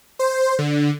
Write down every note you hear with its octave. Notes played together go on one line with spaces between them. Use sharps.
C5
D3